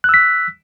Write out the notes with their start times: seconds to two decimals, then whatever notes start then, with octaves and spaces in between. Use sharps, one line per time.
0.04 F#6
0.09 E6
0.14 B6